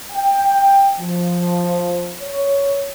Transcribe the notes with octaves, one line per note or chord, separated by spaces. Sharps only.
G5
F3
C#5